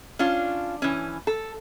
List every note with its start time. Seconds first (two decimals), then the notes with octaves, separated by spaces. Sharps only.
0.19 C#4 D4 F4
0.82 E3 C#4
1.27 A4